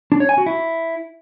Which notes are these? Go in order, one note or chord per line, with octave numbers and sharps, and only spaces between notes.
D4
C#5
G#5
F#4
E4